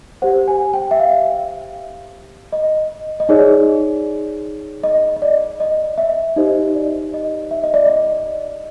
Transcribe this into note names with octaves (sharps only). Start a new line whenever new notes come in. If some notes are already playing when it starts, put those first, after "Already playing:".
G4 C5 F#5
G#5
G5
E5
F5
D#5
D#5
D#4 G#4 C#5 D5
D#5
D#5
D5
D#5
E5
D#4 G4 C5 D#5
D5
D#5
E5
D#5
D5
D#5